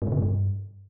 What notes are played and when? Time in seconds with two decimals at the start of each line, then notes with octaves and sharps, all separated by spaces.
0.02 G#2
0.07 B2
0.12 C#3
0.17 G#2
0.22 G2